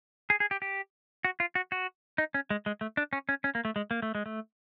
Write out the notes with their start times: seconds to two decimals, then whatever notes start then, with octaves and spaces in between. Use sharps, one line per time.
0.30 G#4
0.40 G#4
0.51 G4
0.62 G4
1.25 F#4
1.40 F4
1.55 F#4
1.72 F#4
2.18 D#4
2.34 C#4
2.50 G#3
2.66 G#3
2.81 A3
2.97 D4
3.13 C#4
3.29 C#4
3.44 C#4
3.55 A#3
3.65 A3
3.76 G#3
3.91 A#3
4.02 A3
4.15 G#3
4.26 A3